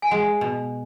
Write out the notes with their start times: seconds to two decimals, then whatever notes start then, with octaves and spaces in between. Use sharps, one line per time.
0.02 G#5
0.11 G#3 F#5
0.41 B2